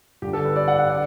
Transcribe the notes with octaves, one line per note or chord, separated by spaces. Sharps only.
G2 D3 G4
A4
B4
D5
F#5
F#5
D3 D5